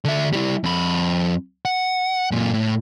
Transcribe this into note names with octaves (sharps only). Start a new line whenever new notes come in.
D3 E5
G3 E4
F2 B5
F#5
F#2 A#2
A2